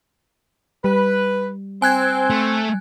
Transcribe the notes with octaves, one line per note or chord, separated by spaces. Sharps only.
G3 B4
C4 G#5 F#6 G#6
A3